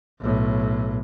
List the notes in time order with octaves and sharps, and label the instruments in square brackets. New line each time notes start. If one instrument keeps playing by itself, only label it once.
[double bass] B1 A2